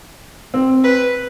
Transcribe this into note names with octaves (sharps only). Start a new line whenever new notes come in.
C4
B4